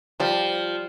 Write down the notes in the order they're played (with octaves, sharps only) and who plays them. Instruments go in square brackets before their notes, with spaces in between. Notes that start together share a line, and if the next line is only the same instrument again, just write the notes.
[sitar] F3 [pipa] G3